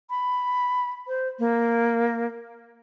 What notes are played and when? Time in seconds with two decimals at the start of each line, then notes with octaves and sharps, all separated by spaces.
0.10 B5
1.08 C5
1.39 A#3